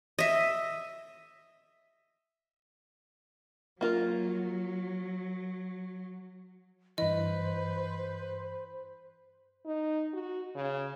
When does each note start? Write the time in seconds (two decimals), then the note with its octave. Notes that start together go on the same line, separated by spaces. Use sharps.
0.19 D#5 E5
3.81 F#3 A#3 F4 A#4
6.98 G2 E3 B4 C5 D#5
9.66 D#4
10.13 F#4
10.55 C#3